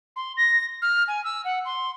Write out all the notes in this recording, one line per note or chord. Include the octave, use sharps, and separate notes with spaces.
C6
A#6
F6
G#5
E6
F#5
C6